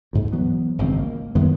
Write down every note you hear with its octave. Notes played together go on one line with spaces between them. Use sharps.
D2 G#2
E3 F#3 B3
G#1 C#2 F#2 C4
A#3
F#2 D#3 G#3 B3